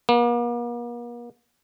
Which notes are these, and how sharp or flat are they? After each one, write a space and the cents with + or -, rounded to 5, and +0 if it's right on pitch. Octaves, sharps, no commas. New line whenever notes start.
A#3 +45